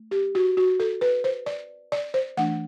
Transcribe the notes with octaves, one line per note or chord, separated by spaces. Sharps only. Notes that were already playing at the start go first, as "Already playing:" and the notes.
Already playing: A3
G4
F#4
F#4
A4
B4
C5
D5
D5
C5
E3 A3 D4 F#5